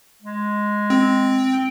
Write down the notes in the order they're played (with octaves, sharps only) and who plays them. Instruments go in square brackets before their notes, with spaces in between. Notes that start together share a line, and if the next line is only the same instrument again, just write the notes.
[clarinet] G#3
[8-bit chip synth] C4
[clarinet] G5